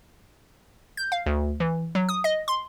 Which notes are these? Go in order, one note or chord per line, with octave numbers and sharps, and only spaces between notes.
G6
F5
D2
E3
F#3
D#6
D#5
C6